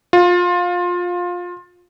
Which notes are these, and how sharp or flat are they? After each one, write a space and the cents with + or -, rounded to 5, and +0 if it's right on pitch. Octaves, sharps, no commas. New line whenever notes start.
F4 +20